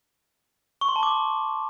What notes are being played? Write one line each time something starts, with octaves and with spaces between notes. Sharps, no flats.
C#6
C6
A5
D6